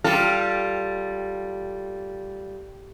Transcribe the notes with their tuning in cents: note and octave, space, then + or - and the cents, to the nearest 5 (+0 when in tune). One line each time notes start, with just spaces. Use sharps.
G3 -10 F4 +0 A4 +5